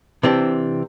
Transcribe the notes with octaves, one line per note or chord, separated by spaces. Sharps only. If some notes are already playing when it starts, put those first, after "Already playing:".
C3 E3 C4 D4